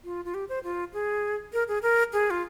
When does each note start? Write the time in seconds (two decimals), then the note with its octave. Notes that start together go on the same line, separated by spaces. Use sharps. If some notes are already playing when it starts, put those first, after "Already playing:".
0.04 F4
0.25 F4
0.34 G4
0.49 C5
0.63 F4
0.93 G#4
1.53 A#4
1.68 G#4
1.82 A#4
2.13 G#4
2.30 F4